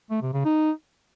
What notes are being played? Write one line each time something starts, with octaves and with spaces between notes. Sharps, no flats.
A3
C3
C#3
D#4